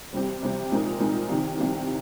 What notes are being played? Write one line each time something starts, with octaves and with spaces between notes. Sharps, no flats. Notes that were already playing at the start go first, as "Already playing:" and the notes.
C3 G3 C4 G4
C3 G3 C4 G4
A#2 G#3 C4 D#4 A#4
A#2 G#3 C4 D#4 A#4
C2 C3 D#3
C2 C3 D#3